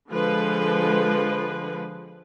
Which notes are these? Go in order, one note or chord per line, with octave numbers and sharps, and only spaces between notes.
D3 F3 G#3 B4